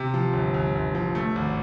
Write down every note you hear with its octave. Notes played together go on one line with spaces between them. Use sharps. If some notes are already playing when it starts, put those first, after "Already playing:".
Already playing: C3
F3
G1
G1
G1
F3
A3
G#1